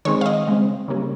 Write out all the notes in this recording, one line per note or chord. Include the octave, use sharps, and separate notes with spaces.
D#3 G#3 C4 C#5
F5
D#5
C#3 G#3 C4
C#3 G3 A#3 C#4